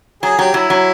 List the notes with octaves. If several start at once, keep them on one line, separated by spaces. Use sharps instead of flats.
F#3 G#4
F#3 G4
F#3 E4
F#3